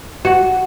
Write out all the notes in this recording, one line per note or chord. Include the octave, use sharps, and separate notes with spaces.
F#4